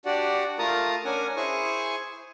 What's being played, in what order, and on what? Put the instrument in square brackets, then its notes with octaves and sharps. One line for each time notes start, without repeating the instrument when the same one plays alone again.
[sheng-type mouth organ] D4 F#4 G4 D5 F#5
A3 F4 A#4 A5 A#5 D#6
C#4 D4 A#4 F#5 G#5
E4 G#4 C5 G#5 C#6